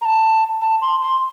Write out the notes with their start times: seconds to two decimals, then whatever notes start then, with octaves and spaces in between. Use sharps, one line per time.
0.01 A#5
0.05 A5
0.62 A5
0.82 C6
1.01 C6